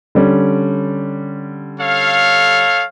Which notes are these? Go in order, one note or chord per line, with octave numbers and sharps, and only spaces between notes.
D3 G3 C#4
A4 C#5 F5